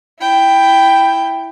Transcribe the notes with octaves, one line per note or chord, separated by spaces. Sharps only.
E4 G5